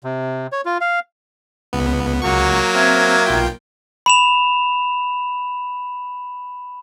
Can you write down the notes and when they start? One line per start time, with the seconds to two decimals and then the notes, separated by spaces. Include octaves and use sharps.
0.04 C3
0.52 C#5
0.65 F4
0.81 F5
1.73 C#2 B3
2.22 C#2 F#3 A#3 F#5 C#6
2.75 C4 E5 F6 G#6
3.26 B1 F4 G5
4.06 B5 E7 F7